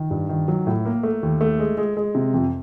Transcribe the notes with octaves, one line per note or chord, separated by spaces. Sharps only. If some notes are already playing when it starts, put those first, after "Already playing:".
Already playing: D#3
G2
D#3
F#3
A2
A#3
A3
D#2
A3
G#3
G#3
G#3
C3
F2